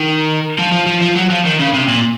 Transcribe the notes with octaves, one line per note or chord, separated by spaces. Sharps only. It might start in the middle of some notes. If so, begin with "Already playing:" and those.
Already playing: D#3
F3
F3
F3
F3
F#3
F3
D#3
C#3
C3
A#2